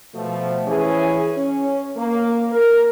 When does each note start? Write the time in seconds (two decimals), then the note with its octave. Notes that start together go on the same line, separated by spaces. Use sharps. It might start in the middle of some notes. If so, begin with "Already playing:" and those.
0.15 B2 F3 A3
0.66 E3 C#4 G#4
1.37 C#4
1.97 A#3
2.52 A#4